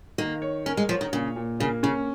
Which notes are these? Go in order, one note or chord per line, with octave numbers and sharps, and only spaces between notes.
D#3 A#3
C#5
C#4 A#4
G#3
F3 C#5
D#3
A#2 C#3
A#2
C#3 A#3
C#3 C#4